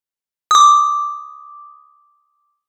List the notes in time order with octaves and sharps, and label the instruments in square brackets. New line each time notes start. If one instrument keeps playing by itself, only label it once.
[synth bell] D6 D#6